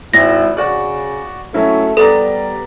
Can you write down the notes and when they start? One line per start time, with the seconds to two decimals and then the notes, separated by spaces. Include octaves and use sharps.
0.13 G#1 E4 A#6
0.57 C#3 F#4 D5
1.54 F#3 A3 C#4 E4
1.97 G3 B3 A4 D5 A#5